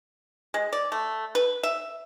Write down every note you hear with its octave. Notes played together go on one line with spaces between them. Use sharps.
G#3
D5
A3
B4
E5